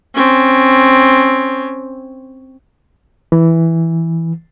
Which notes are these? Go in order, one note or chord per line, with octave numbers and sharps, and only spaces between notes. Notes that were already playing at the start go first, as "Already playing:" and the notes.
C4 C#4
E3